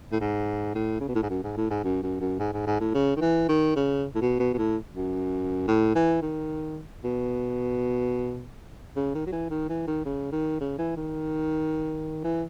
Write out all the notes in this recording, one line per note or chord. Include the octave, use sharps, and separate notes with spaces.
A2
G#2
A2
C#3
B2
A2
G#2
F#2
G#2
A2
G#2
F#2
F#2
F#2
G#2
G#2
G#2
A2
C#3
D#3
E3
D#3
C#3
A2
B2
B2
B2
A2
F#2
A2
E3
D#3
B2
C#3
D#3
F#3
E3
D#3
E3
D#3
C#3
D#3
C#3
E3
D#3
E3